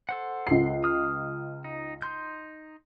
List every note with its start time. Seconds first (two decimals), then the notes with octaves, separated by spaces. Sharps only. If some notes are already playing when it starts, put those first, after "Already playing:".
0.09 A4 C5 F#5
0.47 C#2 C7
0.84 D#6 F6
1.64 D#4
2.02 D#4 C6 G6